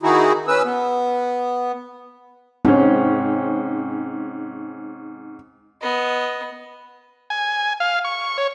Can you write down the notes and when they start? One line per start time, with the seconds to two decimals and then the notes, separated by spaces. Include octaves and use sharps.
0.03 D#3 D#4 E4 F#4 G#4
0.48 C#4 B4 E6
0.65 B3
2.65 G#2 C4 C#4
5.82 B3 D#5
7.30 G#5
7.80 F5
8.05 C#6
8.38 C#5